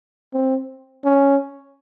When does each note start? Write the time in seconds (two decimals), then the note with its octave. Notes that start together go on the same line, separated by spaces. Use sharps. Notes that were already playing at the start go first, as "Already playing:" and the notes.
0.34 C4
1.04 C#4